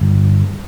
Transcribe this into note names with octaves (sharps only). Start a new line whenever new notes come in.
G1